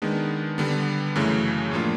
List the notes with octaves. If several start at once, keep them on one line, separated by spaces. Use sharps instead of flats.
D#3 G#3 B3 D4
D3 G3 B3
F#2 C#3 E3 A3
A2 F3 A#3 D4 F4